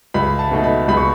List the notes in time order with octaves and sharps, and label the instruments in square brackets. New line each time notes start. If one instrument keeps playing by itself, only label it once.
[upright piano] C#2 B5
A5
B2 A3 D#4
B5
C#2 B5
C#6